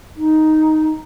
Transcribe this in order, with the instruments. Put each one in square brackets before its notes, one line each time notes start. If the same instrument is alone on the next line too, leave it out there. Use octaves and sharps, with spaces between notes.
[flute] D#4